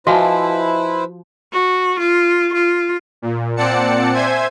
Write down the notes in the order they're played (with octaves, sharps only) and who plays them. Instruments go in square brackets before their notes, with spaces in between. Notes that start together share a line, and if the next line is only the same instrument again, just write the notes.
[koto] F3 [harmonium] E4 B4 C5 [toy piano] F#4 [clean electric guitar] D#5 G#5 A5
[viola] F#4
F4
F4
[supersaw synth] A#2
A#2 C4 D5 F#5 A5 C#7
C5 E5 G#5 G#6